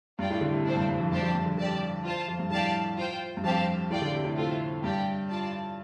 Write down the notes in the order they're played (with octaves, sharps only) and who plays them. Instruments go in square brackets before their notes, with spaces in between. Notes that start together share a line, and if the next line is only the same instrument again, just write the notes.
[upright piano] G2 [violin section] F4 D5 G5
[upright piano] A2
D3
C3
[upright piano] A2 [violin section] D4 A4 C5
[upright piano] G2
G2
F2
[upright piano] G2 [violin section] D4 G4 C5 A5
[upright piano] F2
G2
D3
[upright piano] D3 [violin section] G4 D5 A5
[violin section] F4 C5 A5
[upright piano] F2
G2
[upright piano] A2 [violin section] G4 D5 F5 A5
[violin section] F4 C5 G5
[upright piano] G2
[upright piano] F2 [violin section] C4 G4 C5 F5 A5
[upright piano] A2 [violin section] F4 D5 G5
[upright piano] D3
C3
A2
[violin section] A3 C4 F4 A4
[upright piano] G2 [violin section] G4 D5 G5
[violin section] F4 D5 A5